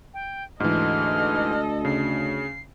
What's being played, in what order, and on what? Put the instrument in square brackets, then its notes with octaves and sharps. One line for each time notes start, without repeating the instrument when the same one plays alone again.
[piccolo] G5
[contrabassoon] D2 [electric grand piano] G#2 E3 [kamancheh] A4 D#5 [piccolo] F6
[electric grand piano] C#3 [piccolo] C7